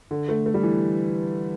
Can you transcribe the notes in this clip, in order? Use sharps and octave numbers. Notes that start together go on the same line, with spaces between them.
D3
A3
A3
G3
E3